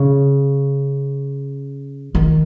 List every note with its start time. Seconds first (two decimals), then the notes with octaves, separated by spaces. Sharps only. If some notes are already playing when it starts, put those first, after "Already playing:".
Already playing: C#3
2.15 D#3